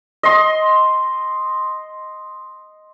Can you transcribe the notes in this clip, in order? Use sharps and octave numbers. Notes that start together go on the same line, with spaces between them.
D#5 C6